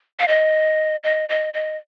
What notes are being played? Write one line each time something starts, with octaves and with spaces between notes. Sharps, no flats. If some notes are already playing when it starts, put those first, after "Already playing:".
F5
D#5
D#5
D#5
D#5